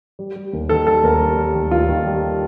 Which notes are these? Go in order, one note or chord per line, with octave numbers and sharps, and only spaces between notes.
G3
G3
D#2
D#3 A4
G3 A4
D#2 A#4
G3
G3
D#2
D#2 F4
D#3
G3